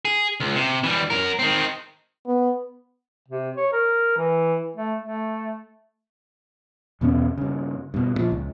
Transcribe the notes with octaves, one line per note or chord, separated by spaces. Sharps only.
G#4
C#2
C3
E3 G3
F#2 A#4
D#3 C4
B3
C3
C#5
A#4
E3
A3
A3
E2 B2 B3 C#4
G2 C#3
G2 B2
A#2 F3
C#2